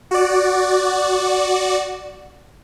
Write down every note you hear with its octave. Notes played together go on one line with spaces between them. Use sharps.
F#4 D5